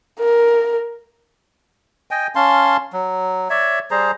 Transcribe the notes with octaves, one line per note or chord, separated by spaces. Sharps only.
A#4
D#5 G5 G#5
C#4 F5 A5 C6
F#3
C#5 D5 E5
G3 G#4 C5 A#5